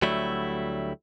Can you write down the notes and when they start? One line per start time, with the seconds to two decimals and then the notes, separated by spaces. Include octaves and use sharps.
0.02 D2 F#3 G3 A3 E4